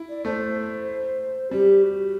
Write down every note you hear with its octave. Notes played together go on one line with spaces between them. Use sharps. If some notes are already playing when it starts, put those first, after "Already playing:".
Already playing: E4
D5
A3 C5
G3 G4
F#4